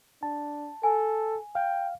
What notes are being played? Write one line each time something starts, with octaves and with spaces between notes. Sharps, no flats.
D4 A5
A4 G#5
F5 G5